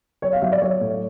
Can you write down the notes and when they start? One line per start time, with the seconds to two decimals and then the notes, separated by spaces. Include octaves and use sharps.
0.22 F#3 C#5
0.33 F5
0.42 F#3 E5
0.52 D5
0.62 F#3 C#5
0.81 A2